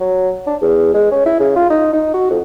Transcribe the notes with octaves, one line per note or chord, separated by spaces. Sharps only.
F#3
D4
E2
G#3
C#4
E4
C#3
F4
D#4
D#4
F#4
F2